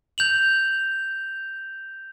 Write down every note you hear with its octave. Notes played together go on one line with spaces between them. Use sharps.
G6 F7 F#7